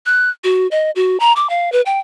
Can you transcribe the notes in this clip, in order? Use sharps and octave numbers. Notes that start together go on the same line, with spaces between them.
F#6
F#4
D#5
F#4
A#5
D6
F5
B4
G5